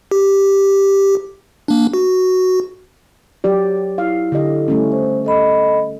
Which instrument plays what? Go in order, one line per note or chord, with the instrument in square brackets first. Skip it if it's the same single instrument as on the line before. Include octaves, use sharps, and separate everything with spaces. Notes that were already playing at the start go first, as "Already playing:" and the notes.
[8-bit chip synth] G4
A#3 D4
F#4
[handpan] F#3 G4 D5
[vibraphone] E4 [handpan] F5
[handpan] D3 G4 D#5
G3 A3 C#4
[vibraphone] C5
A4 D#5 B5